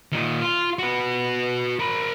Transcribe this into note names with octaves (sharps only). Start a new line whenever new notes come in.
A#2 D#3
F4
F#4 B4
A#4 B5